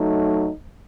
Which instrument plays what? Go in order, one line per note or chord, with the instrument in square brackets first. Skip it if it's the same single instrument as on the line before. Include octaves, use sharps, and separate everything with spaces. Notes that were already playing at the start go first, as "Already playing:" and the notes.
Already playing: [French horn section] F#3 A3 D#4